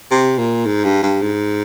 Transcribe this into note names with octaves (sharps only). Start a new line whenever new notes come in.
C3
A#2
G#2
G2
G2
G#2